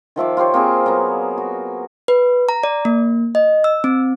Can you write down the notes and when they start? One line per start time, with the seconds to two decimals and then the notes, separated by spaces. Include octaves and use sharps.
0.16 D#3 F3 E5 D6
0.37 F4 G4 C5 C#5
0.54 A#3 C4 G#4
0.86 F#3 A#3 B3
1.37 F#4
2.08 B4
2.49 A#5
2.63 D5
2.85 A#3
3.35 D#5
3.64 E6
3.84 C4